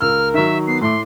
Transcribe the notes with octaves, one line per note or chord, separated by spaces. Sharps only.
C#2 A#4 E6 F6
D#3 F#3 E5
B3 C7
A2 A3 C6 D6